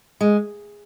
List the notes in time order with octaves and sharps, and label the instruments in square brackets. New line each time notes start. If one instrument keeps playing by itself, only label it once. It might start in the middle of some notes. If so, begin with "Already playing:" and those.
[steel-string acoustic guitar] G#3